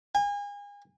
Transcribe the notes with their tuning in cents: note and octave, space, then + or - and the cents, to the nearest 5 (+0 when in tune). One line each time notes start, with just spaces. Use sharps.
G#5 -35